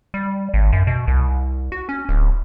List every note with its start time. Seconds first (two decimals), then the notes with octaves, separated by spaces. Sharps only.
0.14 G3
0.54 G#1
0.73 F#2
0.87 B2
1.07 C2
1.72 F#4
1.89 C#4
2.09 D1